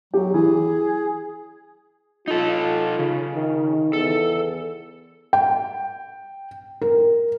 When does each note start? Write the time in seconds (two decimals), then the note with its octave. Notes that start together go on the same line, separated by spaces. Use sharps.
0.14 F#3 G4
0.34 E3 G#4
2.28 D#4 F4 A4
2.99 C#3
3.35 D#3
3.93 E2 A4
5.33 G5
6.82 A#4